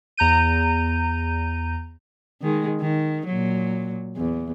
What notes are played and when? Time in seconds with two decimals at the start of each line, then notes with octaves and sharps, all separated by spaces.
0.17 E2 A#5 G6 D#7
2.42 D#3 G#3
2.80 D#3
3.27 A#2 F#3
4.17 E2